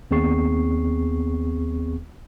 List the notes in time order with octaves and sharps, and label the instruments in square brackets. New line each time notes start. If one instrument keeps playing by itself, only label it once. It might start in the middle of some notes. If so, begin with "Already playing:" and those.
[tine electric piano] D#2 B3 C4 G#4 C#6 C7